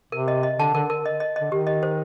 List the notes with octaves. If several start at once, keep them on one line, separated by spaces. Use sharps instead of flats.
C3 A#4
D#5
D#5
D3 A5
D3 A#4
A#4
D#5
D#5
D3 D#5
D#3 G4
D#5
C5